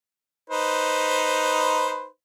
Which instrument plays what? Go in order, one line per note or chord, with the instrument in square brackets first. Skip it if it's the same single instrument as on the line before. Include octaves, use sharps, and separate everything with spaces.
[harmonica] D#4 B4 C5